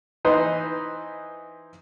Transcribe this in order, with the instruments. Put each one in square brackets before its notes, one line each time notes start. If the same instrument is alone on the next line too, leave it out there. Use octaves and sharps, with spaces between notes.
[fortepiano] E3 D#4 B4 C5 D#5